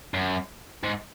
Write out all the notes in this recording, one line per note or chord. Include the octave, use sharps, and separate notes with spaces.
F#2
G#2